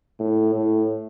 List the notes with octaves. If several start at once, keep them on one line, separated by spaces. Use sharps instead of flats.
A2
A2